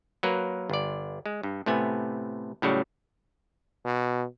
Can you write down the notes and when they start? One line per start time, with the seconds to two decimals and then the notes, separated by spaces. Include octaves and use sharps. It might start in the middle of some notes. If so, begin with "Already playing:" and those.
0.23 F#3 A#3 A#4 B4
0.70 G1 D5
1.26 G#3
1.43 G2
1.66 A2 C3 A3 B3 G#5
2.62 A2 C#3 F#3 G3
3.85 B2